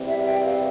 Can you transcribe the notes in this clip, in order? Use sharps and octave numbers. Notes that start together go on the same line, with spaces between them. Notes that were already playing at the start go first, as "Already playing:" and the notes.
Already playing: E2 C3 G3 C4
E5
G5
F5